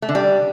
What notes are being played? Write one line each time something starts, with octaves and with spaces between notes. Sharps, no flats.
A3
D3
G3